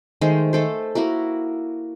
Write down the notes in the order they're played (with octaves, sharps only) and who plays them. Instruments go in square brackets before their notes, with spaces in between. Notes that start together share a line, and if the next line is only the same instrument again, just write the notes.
[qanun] D#3 G#3 A3 C5
A3 A4 C5
A#3 E4 F#4 A#4